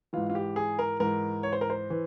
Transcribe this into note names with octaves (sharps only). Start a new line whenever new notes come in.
G#2 E3 F4
F4
G4
G#4
A#4
G#2 E3 A#4
C#5
C5
A#4
C5
E3